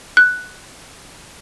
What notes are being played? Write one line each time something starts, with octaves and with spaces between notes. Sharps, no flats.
F#6